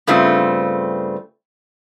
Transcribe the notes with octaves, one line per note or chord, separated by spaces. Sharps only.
G2 C#3 A3 C4 F4